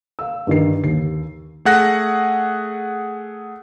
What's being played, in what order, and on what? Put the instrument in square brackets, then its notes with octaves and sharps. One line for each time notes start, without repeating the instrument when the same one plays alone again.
[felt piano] F5 E6
G2 D#3 C7
D#2 C7
[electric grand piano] A3 G#4 F#5 F#6 A#6